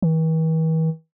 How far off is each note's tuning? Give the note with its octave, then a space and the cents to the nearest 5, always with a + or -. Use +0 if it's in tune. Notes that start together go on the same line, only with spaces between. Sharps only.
E3 -45